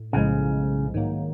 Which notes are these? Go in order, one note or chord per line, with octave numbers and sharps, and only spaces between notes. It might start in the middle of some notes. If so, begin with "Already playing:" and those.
Already playing: A2
B1 A2 C#3 F3 G#3
G#2 D#3 F#3 A#3